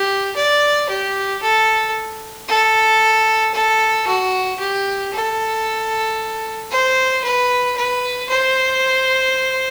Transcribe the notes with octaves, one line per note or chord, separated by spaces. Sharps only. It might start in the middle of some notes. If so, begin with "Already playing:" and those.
Already playing: G4
D5
G4
A4
A4
A4
F#4
G4
A4
C5
B4
B4
C5